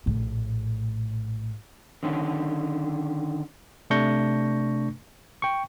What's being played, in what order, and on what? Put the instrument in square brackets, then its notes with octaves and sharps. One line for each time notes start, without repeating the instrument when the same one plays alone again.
[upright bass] A#1 A2
[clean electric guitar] D3 D#3 C#4
[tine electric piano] C3 A3 D4 C#6 G6 A#6
G5 C#6